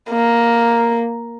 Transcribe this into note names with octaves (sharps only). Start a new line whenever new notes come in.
A#3